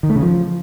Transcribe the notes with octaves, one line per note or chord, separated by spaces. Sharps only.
D#3
A3
C#3
F3